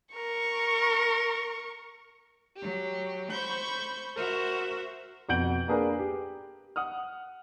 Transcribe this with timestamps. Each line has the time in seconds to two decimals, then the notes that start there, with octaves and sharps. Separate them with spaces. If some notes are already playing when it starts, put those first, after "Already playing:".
0.15 A#4 C#6
2.57 F#3 G4
3.30 C5 B5 C#6 G6
4.17 F#4 A#4 C5 E5
5.29 F2 B2 F#5 G6 D7 F#7
5.68 A#3 D4 G#4 A#4 B4
5.99 G4
6.76 F#5 D#6 F6